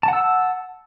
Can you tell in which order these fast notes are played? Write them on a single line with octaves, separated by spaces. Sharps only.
A5 F#5 E6